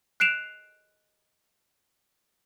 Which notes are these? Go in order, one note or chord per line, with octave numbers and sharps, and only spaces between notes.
F#6 C7 D7 E7 F7